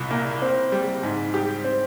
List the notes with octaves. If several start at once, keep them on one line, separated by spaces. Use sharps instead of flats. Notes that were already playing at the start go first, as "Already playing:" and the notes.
Already playing: C2 A#2
A#3
C4
G3
G#2
G4
C4